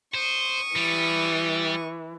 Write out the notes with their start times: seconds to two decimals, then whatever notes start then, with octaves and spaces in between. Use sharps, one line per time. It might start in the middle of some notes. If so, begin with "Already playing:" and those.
0.14 C5 C#6 D#6
0.76 E3 G3